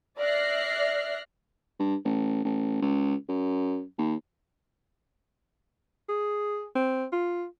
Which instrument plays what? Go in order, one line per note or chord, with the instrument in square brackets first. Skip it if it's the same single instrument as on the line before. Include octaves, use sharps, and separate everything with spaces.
[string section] D5 E5 F6 F#6 A#6 C7
[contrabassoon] G2
A1
A1
C#2
F#2
D#2
[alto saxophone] G#4
C4
F4